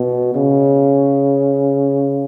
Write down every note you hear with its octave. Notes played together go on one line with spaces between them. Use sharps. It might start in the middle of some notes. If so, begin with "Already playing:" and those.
Already playing: B2
C#3